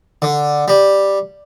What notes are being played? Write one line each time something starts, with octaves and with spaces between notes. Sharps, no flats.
D3
G3